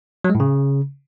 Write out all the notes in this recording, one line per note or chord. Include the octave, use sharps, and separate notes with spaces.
F#3
G#3
A2
C#3